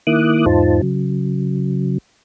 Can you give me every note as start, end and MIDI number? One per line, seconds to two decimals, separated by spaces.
0.07 0.46 51
0.07 0.46 58
0.07 0.46 64
0.07 0.46 86
0.07 0.46 87
0.07 0.46 90
0.46 0.81 40
0.46 0.81 44
0.46 0.81 63
0.46 0.81 65
0.46 0.81 72
0.46 0.81 81
0.82 1.98 49
0.82 1.98 54